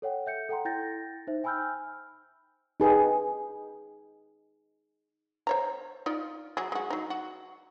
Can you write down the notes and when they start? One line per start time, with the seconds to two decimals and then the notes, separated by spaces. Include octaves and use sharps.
0.02 A4 C#5 F#5 G5
0.26 E5 G6 C#7
0.49 A4 F#5 G5 A#5 C6
0.65 E4 G5 G6 A6 A#6
1.27 D#4 C5 E5
1.44 G5 G#5 B5 E6 F6 G6
2.80 D#4 G#4 B4 G5
5.47 C5 C#5 A#5
6.06 D#4 F4 D5
6.57 F#3 G#4
6.72 G#3 F#4
6.90 F#3 D#4
7.10 F#4